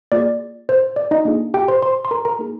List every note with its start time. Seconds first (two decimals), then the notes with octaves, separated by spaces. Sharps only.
0.12 A#3 F4 G#4 D5
0.69 C5
0.96 D5
1.11 D#4 D#5
1.25 A#3 D4 F4 G#4
1.54 G4 G5
1.68 C5 C6
1.82 C5 C6
2.05 C6
2.11 A#4 A#5
2.25 A#4 A#5
2.39 A#3 D#4 G#4